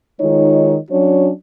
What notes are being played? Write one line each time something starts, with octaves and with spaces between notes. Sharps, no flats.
D#3 G#3 D#4 F4 C#5
F#3 C#4 D4 F#4 C#5